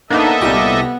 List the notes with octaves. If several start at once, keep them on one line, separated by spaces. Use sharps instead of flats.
A#3 B3 D4 D#4 A4 D#5 E5 F#5
C2 A#2 G3 B3 G4 A#6